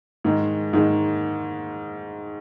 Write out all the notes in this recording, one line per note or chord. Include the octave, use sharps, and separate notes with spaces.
G#2 D#3 G#3
G#2 D#3 G#3